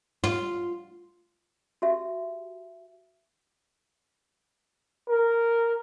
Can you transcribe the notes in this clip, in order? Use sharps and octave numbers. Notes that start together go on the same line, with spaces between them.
F4
F#4 G4 E5
A#4